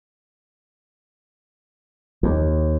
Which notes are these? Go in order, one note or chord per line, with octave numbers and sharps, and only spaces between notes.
D#2